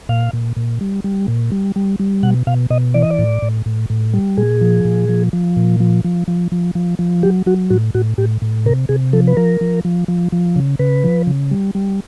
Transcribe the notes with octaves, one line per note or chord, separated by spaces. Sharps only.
A#2 F5
A#2
A#2
G3
G3
A#2
G3
G3
G3
B2 F#5
B2 F5
B2 D#5
E3 D5
D#5
D5
A2
A2
A2
A2
G3
A#2 G#4
F3
A#2
F3
F3
A#2
F3
F3
F3
F3
F3
F3
F#3 G4
F#3 F#4
A2 F#4
A2 F#4
A2 G4
A2
C3 A#4
C3 G#4
F3 A4
B4
F3 A#4
F3
F3
F3
F3
C#3
C#3 B4
F3
C#3
G3
G3